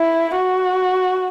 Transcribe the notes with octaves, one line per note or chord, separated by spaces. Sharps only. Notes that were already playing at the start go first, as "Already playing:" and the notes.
Already playing: E4
F#4